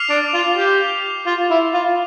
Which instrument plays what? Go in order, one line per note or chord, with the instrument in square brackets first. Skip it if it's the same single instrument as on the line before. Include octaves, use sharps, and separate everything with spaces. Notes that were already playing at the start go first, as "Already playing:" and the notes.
Already playing: [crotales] D6 F6 C7 F7
[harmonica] D4
F4
G4
F4
E4
F4